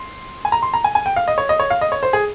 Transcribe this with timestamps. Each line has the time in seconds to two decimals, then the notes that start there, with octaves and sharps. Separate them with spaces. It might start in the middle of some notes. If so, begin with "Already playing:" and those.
Already playing: C6
0.45 G#5
0.52 A#5
0.62 C6
0.74 A#5
0.84 G#5
0.95 G#5
1.06 G5
1.16 F5
1.28 D#5
1.38 C#5
1.49 D#5
1.60 C#5
1.70 F5
1.81 D#5
1.92 C#5
2.03 C5
2.13 G#4